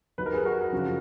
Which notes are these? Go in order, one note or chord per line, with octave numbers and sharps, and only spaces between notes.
D#2 D#3 F#3 B4
A#4
G#4 B4
F#4 A#4
F#2 C#3 F3